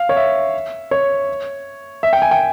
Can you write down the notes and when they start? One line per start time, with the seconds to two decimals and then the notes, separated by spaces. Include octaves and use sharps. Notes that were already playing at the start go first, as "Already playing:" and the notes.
Already playing: F5
0.09 C#5
0.16 E5
0.91 C#5
2.03 E5
2.13 G5
2.22 G#5
2.31 G5